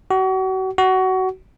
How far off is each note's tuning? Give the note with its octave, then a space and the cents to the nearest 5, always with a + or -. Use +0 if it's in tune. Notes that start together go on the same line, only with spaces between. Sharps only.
F#4 +35
F#4 +20